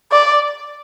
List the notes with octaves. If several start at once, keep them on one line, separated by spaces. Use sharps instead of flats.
D5